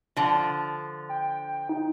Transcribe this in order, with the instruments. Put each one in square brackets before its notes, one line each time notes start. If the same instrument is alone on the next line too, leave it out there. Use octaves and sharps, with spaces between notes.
[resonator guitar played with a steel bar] D3 F3
[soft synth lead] G5
D#4